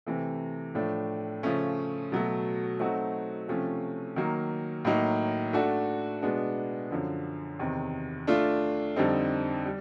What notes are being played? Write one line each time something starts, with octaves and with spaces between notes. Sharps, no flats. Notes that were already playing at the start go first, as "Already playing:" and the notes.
C3 E3 A3
A2 F3 A3 D4
C#3 F3 A3 C#4
B2 F#3 A3
F#3 A3 C4 D#4 F#4
C3 F3 A3 C#4
D#3 F#3 A#3
A2 F#3 A#3 D#4
A3 D4 F#4 A4
B2 G#3 B3 D4
F#2 D3 F3
E2 C3 D#3
A3 D4 F4
F2 D3 G3 C4 D#4
G3